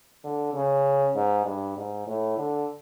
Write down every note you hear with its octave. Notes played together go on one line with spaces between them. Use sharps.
D3
C#3
G#2
G2
G#2
A2
D3